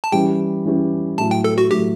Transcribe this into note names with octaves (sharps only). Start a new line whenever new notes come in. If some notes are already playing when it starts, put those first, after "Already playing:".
A5
E3 G3 C#4 G4 G5
E3 G3 C#4 G4
A2 F#3 A3 A5
G5
A4
F#4
A2 F#3 A3 G4